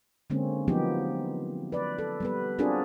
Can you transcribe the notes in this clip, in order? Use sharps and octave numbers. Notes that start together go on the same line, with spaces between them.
D3 G#3 A#3 C4 C#4
F3 F#3 A#3 B3 D#4 G4
B4 D5
A4
G3 B3 B4
C4 D4 F4 F#4 G#4 A#4